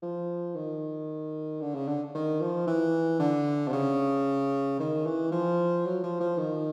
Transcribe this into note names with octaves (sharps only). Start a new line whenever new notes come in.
F3
D#3
D3
C#3
D3
D#3
F3
E3
D3
C3
C#3
D#3
E3
F3
F#3
F3
F3
D#3